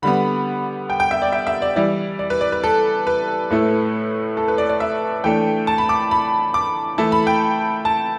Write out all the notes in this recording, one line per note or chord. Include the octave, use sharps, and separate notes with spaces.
D3 G3 B3 B5
G5
G5
E5
D5
E5
E5
D5
E3 G3 E4 D5
D5
B4
D5
B4
A4
B4
A2 A3 E4
A4
B4
D5
D5
E5
E3 A3 D4 G5
A5
B5
D6
B5
D6
E3 A3 E4 A5
B5
G5
A5